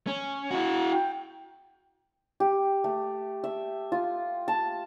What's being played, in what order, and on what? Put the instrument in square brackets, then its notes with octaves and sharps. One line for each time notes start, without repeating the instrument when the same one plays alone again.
[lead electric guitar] C#4
E4 F#4
[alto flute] G5
[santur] G4
A3
E5
F4
A5